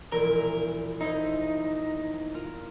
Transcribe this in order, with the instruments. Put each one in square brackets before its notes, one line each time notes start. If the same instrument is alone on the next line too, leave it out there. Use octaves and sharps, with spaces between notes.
[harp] E1 A#1 E4 [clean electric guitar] A#4
[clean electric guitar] D#4 [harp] E4 C5
[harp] F4 A#4